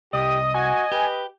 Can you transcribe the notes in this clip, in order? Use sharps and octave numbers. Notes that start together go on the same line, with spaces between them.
C2 G4 D#5 D#6
F#4 G#5
G4 B4